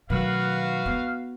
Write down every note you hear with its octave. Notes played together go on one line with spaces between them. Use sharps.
B2 D#3 F#3 A3 F#4 B4 F5
B3